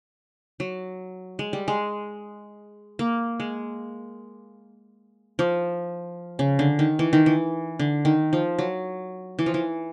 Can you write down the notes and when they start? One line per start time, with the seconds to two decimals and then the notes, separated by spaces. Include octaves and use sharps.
0.60 F#3
1.39 G#3
1.53 G3
1.68 G#3
2.99 A#3
3.40 G#3
5.39 F3
6.39 C#3
6.59 D3
6.79 D#3
6.99 E3
7.13 D#3
7.26 E3
7.79 D3
8.05 D#3
8.33 F3
8.58 F#3
9.39 E3
9.46 F3
9.54 E3